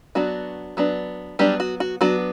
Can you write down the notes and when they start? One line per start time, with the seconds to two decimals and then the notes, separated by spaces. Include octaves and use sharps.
0.15 F#3 B3 D4 F#4
0.77 F#3 B3 D4
1.39 F#3 G3 B3 D4 G4
1.60 F#4
1.80 F#4
2.01 F#3 B3 D4 F#4